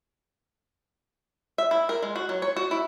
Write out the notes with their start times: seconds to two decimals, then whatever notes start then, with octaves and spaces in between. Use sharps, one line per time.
1.58 E5
1.71 E4
1.89 A#4
2.02 G#3
2.16 F#4
2.29 F#3
2.42 C#5
2.56 F#4
2.71 E4